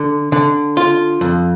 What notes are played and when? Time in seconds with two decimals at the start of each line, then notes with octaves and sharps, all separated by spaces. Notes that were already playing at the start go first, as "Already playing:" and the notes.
Already playing: D3
0.32 D3
0.77 F4
1.21 F2